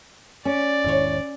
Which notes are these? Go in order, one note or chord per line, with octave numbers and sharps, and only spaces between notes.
C#4 D5
E1 G#2 D#3 E4 C#5